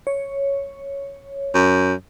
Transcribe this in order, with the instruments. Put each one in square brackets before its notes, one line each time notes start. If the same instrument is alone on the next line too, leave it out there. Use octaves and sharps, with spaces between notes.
[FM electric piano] C#5
[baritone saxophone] F#2